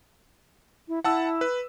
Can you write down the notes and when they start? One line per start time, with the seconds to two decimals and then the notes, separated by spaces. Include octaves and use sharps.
0.88 E4
1.04 E4 F#5 A5 E6
1.41 B4